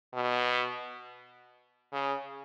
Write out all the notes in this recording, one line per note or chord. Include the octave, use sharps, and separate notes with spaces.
B2
C#3